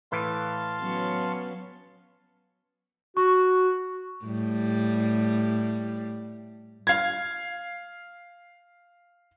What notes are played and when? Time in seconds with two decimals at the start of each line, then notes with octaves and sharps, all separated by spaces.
0.12 A2 E3 F5 A5 C6
0.80 F#3 B3 C#4
3.17 F#4 C#6
4.25 A2 G3
6.87 F5 G#6